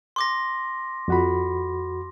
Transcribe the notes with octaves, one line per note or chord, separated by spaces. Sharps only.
C6 D6 A#6
F2 F#4 B5